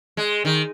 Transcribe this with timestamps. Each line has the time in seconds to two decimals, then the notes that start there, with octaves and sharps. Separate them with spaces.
0.17 G#3
0.45 D#3